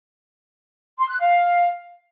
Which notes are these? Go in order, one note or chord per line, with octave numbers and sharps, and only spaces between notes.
C6
F#6
F5